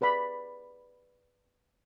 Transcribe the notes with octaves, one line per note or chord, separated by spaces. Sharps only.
G#4 B4 D5 B5